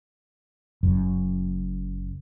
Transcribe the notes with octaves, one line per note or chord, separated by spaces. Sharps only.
F#1 F#2